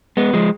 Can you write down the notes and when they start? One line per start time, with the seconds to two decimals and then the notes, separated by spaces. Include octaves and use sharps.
0.17 G#3 B3
0.33 F3 G#3